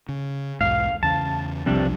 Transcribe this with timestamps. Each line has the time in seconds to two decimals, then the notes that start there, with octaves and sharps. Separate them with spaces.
0.09 C#3
0.61 B1 E2 G#2 F5
1.03 E2 C#3 A5
1.66 B1 C3 F3 G3 D4